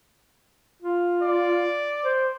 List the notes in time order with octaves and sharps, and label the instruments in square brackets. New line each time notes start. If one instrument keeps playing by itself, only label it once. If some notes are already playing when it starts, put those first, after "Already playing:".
[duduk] F4
[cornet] D5
[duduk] C5